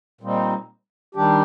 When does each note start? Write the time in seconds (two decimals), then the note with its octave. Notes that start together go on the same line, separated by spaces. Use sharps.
0.21 A#2 G3 C4 D#4
1.15 D#3 G3 D4 G4